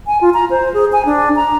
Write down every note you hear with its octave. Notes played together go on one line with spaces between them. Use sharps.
G#5
F4
A#5
C5
G#4
G#5
D4
A#5